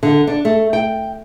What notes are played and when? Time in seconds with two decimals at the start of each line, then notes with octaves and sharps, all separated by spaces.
0.03 D3
0.27 D4
0.45 A3
0.73 G5